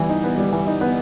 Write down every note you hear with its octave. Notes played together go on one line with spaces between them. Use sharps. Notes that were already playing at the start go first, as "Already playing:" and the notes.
Already playing: E3 G3 B3
D#4
B3
G3
E3
D#4
B3